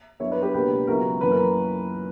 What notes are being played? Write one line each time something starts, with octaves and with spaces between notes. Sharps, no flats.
G2 F#3 B3 E4 C#5 E5
B4 D5
G4 B4
C#2 B2 A#3 D4 G4 B4
C#2 C#3 F#3 B3 E4 F#4 A#4
F#2 E3 A#3 C#4 B4
A#4